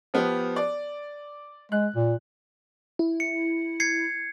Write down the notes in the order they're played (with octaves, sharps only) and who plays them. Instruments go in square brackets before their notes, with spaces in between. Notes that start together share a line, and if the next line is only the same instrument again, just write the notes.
[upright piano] F3 B3 G4
D5
[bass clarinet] G#3 [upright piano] F#6
[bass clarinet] A#2
[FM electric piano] E4
[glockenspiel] C#7
G#6 C7 C#7